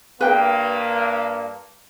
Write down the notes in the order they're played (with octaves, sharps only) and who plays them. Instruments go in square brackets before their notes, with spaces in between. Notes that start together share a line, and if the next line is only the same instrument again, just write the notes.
[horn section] G2 A#3 [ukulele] B4 G5